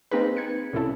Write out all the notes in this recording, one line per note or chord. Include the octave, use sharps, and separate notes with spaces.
A#3 C4 D#4 G#4 B4
G#6 C#7
C2 A2 C#4 E4 A4